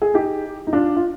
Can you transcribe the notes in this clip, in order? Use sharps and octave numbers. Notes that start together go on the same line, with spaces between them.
G#4
D#4 G4
D#4
D4 F4
F4